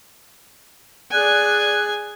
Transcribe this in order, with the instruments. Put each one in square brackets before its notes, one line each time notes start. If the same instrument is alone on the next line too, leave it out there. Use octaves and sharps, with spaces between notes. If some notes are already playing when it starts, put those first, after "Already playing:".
[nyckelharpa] G#4 G#5 [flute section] D5 F#6